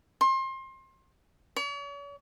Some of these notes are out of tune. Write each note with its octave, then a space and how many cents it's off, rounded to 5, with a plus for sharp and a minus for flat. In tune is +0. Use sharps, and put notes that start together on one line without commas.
C6 +30
C#5 +45